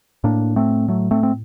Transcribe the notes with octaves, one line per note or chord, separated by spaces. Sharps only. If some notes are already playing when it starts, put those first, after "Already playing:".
A2 A#3 D4
A3 C4
F#3 A3
A3 C4
C4